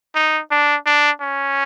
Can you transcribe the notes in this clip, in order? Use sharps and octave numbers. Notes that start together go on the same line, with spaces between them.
D#4
D4
D4
C#4